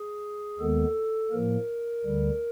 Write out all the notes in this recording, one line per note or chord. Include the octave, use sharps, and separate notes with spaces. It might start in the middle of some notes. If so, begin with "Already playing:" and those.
Already playing: G#4
D#2 D#3 G#3 B3 A4
A2 F3 A#3 A#4
D2 D3 G3